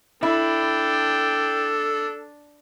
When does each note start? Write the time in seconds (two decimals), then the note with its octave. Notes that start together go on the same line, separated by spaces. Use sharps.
0.23 D4 E4 A4 G5